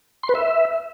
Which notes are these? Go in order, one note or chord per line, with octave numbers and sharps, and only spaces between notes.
C6
B4
E5